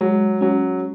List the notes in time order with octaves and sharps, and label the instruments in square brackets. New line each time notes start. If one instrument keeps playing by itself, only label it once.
[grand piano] F#3 [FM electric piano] G#3
[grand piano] F#3 [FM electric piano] C#4